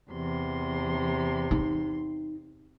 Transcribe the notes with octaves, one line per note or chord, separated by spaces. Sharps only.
E2 C3 C6
D#4